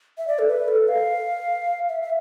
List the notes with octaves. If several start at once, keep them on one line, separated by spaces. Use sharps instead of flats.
E5
D5
A4
B4
A4
F5
E5
E5